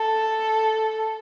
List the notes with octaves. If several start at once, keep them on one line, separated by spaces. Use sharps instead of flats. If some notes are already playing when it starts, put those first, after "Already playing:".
Already playing: A4